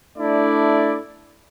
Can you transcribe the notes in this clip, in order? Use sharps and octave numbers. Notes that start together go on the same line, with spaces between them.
A3 D4 E4 D5